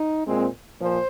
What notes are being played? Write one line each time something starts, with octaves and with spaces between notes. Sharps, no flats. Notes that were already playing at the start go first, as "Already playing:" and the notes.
Already playing: D#4
A#2 G#3 C4
A#2 F3 C5